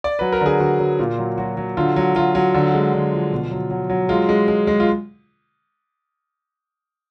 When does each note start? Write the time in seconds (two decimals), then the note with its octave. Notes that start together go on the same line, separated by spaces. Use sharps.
0.04 D5
0.19 F#3 B4
0.32 A#4
0.41 D3 G#4
0.60 D3 F#4
0.80 F#3
0.99 A#2 F4
1.18 F#3
1.38 F#3 F#4
1.57 F#3
1.77 D3 F4
1.96 F#3
2.15 F#3 F4
2.35 F#3
2.54 D3
2.74 G#3
2.93 D3
3.13 F3
3.32 B2
3.51 F#3
3.71 F#3
3.90 F#3
4.09 G#3 F4
4.29 G#3
4.48 G#3
4.67 G#3
4.80 F4